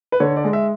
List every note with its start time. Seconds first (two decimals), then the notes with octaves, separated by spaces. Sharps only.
0.12 B4
0.20 D3 C#5
0.37 D5
0.44 G#3
0.53 E5